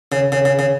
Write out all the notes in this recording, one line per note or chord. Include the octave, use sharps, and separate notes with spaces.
C#3
C#3
C#3
C#3